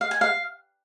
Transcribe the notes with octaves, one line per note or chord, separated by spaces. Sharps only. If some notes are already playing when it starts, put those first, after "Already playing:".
F5
G#5
F5